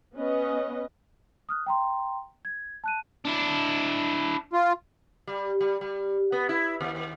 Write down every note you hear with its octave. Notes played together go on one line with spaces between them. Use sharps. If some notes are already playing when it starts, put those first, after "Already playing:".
B3 C#4 B4 D#5
D#6 F6 F#6
G5 A#5 C6
G#6
A5 F#6 D#7
D4 E4
F4
G3
G3
G3
B3
E4
D#2